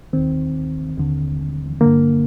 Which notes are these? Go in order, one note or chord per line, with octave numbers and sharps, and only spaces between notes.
D#2 D#3 C4
D#2 D3
G2 D3 A#3